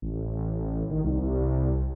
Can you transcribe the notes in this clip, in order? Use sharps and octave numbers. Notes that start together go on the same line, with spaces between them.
A1
D#3
C2